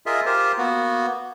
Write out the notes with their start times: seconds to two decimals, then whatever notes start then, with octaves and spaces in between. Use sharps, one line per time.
0.06 F4 G#4 A#4 D#5 E5
0.26 F4 G4 A#4 C5
0.58 A#3 B3 F#4